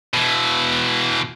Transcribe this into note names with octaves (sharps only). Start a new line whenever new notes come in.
B2 E3